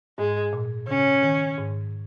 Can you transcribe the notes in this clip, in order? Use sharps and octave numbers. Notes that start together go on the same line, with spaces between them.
G#2 G#3
A#2
C#3 C#4
D#3
G#2